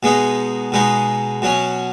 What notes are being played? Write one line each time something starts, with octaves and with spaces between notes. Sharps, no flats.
B2 G#3 B3 D#4
B2 G#3 B3 D#4
B2 F#3 C#4